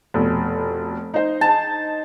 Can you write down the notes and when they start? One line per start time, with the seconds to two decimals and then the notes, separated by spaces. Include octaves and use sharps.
0.14 F1 B2
1.14 D#4 C5
1.41 A5